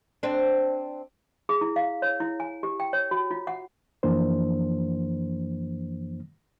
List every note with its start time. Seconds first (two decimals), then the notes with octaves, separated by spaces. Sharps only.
0.23 C4 D4
1.49 G#4
1.61 E4
1.76 F5
2.02 C#5
2.20 E4
2.40 G#5
2.63 G4
2.80 G5
2.93 C#5
3.11 F#4
3.31 F4
3.47 F#5
4.03 F#2 E3 F3 A#3 D4 C5